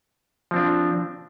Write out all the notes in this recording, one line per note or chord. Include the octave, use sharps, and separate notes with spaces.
F3 C4 D4